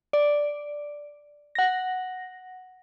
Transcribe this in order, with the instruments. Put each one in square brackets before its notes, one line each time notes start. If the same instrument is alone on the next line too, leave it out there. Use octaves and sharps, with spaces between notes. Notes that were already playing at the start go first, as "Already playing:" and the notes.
[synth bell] D5
F#5 A#6